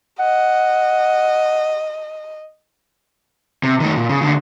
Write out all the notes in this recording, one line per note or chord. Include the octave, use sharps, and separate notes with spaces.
D#5 F#5
C3
D#3 A3
A#2
C#3
D#2 D3